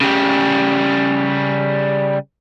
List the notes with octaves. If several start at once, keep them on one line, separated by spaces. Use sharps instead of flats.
C#3 G3